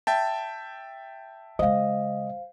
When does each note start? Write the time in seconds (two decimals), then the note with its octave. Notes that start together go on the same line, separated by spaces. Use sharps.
0.07 E5 G5 A5
1.59 C#3 G#3 C5 D#5 F5